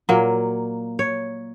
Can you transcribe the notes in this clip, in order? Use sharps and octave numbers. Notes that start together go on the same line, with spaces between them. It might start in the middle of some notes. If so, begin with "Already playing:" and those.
A#2 F#3 A#3
C#5